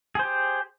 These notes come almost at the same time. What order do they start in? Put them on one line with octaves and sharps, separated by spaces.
G#4 C5 G4